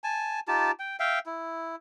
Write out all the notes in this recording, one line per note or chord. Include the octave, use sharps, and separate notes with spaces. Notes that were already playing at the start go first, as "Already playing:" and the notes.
G#5 A5
D#4 F4 G4 A5
G5
E5 F5 G5
E4